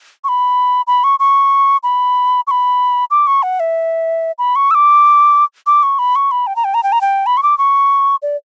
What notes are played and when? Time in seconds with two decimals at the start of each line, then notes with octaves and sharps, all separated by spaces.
0.24 C#6
0.28 B5
0.87 B5
1.04 C#6
1.19 C#6
1.83 B5
2.47 C#6
2.51 B5
3.11 D6
3.27 C#6
3.43 F#5
3.60 E5
4.38 B5
4.56 C#6
4.71 E6
4.75 D6
5.66 D6
5.83 C#6
5.99 B5
6.15 C#6
6.31 B5
6.47 G5
6.56 A#5
6.64 G5
6.74 A#5
6.83 G5
6.92 A#5
7.01 G5
7.26 B5
7.37 C#6
7.43 D6
7.58 C#6
8.22 D5